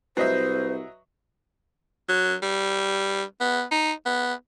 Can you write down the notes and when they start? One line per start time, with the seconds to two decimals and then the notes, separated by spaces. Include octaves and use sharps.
0.17 C2 F#3 B4 C5 D#5 E5 C7
2.09 F#3
2.42 G3
3.40 B3
3.71 D#4
4.06 B3